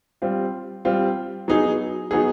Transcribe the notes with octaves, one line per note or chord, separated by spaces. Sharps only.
G3 C4 F4
G3 C4 F4
F#3 B3 D#4 G#4
F#3 B3 D#4 G#4